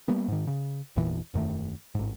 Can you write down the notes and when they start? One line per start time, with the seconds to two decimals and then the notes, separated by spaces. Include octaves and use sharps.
0.08 G3 A#3 B3
0.28 G#2 D#3
0.47 C#3
0.96 G#1 E2 A#2 E3
1.34 E1 F#2 D#3 A3
1.95 A1 G#2